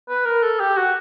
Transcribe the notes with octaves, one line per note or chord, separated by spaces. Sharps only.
B4
A#4
A4
G4
F#4